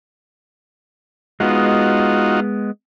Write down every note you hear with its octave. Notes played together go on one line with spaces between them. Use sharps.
G#3 B3 D#4 F4 F#4